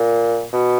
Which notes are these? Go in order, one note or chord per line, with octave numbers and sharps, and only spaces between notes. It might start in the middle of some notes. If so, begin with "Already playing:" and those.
Already playing: A#2
B2